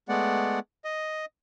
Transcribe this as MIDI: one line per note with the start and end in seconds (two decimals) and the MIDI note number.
0.09 0.59 56
0.09 0.59 57
0.09 0.59 59
0.09 0.59 74
0.09 0.59 78
0.85 1.25 75